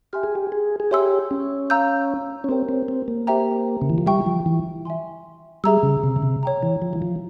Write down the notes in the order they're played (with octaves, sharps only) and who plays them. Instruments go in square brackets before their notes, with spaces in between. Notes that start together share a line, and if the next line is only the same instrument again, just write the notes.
[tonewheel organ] G4 [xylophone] E5 G#5 C6 F6
[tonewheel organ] G#4
G4
G#4
G#4
[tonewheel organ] G4 [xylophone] C#5 E5 G#5 C6 E6
[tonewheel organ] C#4
[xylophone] F5 A#5 E6 G6
[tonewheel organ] C#4
[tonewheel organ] C4 [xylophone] G4 A#4 C#5 G5
[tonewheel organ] C4
C4
A#3
[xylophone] G4 C5 E5 G5 A#5
[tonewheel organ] C#3
E3
F3
[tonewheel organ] G3 [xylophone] E5 G5 C#6
[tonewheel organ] F3
E3
[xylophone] E5 G#5 C6
[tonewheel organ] G3 [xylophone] G#4 E5 A#5 E6
[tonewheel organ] C#3
C3
C#3
C3
[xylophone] C#5 G5 A#5
[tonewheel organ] E3
F3
E3
F3